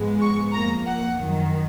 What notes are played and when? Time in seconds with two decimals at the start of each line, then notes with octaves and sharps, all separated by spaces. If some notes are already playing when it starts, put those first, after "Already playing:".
Already playing: G#2 F3 G#3 B3
0.21 C#6
0.53 F2 F3 A#3 A#5
0.85 F#5
1.17 F#2 D#3 F#3